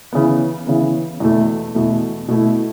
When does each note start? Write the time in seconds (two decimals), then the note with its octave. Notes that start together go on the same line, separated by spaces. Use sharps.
0.13 C#3 E3 B3
0.67 C#3 E3 B3
1.20 E2 B2 A3
1.75 E2 B2 A3
2.28 B2 A3 E4